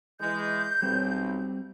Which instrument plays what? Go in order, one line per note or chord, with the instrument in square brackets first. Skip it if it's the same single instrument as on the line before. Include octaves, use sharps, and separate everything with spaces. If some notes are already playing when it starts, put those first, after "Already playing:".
[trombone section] E3 G#3 [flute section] G6
[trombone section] B1 [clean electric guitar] G3 C4